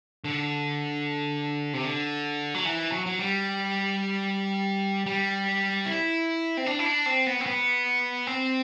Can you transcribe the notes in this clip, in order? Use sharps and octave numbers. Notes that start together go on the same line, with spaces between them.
D3
C3
D3
F#3
E3
F#3
F#3
G3
G3
E4
C4
D4
E4
D4
C4
B3
C4
B3
C4